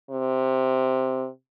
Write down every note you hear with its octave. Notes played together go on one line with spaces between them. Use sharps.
C3